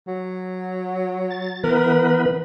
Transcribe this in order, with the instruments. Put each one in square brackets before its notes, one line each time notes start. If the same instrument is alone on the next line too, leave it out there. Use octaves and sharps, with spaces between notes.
[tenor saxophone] F#3
[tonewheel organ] A6
[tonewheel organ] E3 B3 B4 [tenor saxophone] A#4